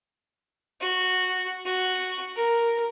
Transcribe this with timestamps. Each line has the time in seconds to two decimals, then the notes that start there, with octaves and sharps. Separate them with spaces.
0.80 F#4
1.65 F#4
2.36 A#4